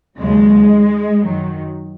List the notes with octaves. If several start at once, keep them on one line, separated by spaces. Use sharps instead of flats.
D#2 C#3 F#3 G#3
F#2 D#3 F#3